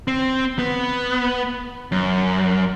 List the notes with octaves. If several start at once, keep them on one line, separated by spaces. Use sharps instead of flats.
C4
B3
F#2